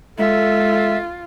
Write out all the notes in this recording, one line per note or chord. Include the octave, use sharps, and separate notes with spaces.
G#3 F4 A4 E5